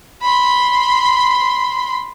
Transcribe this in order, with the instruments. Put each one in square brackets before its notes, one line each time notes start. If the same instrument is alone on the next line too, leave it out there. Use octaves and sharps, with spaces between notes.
[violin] B5 C6